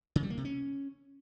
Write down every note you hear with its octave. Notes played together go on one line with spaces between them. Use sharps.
C#3
G3
A#3
C3
C#4